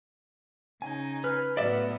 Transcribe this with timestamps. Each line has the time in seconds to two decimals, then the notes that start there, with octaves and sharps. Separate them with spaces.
0.82 C#3 D#4 G#5 G#6
1.24 B4 F6
1.57 A2 F#3 B3 D5 E5